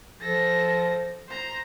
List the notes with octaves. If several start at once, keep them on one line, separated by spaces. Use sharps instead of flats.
F3 A4 A#6
C5 A#5